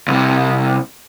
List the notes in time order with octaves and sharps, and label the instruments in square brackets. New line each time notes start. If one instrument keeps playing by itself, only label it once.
[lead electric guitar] C2 C3